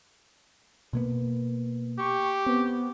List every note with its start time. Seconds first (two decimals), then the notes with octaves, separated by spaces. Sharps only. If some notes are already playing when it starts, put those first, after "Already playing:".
0.93 B2 A#3 B3
1.99 G4 C#6
2.46 B3 C4